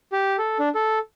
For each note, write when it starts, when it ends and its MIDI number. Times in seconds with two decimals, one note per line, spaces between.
0.12 0.37 67
0.38 0.58 69
0.60 0.69 62
0.75 0.99 69